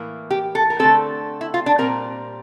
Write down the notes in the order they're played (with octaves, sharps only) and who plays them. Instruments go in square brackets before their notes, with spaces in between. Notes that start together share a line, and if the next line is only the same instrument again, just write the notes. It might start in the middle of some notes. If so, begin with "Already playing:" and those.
Already playing: [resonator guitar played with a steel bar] A2 E3 A#3
G4
A4
A#4
D3 A3 C4 A4
E4
F4
D4
A#2 G3 C4 A#4